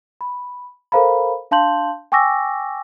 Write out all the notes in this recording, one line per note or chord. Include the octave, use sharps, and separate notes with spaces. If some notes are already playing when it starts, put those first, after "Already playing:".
B5
A4 A#4 C5 F5 A#5 B5
D4 F5 A5 C6 G6 F#7
G5 G#5 C#6 D6 E6 A#6